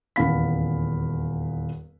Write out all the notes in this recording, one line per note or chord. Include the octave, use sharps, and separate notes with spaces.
D#1 E2 B3 F5 B5 B6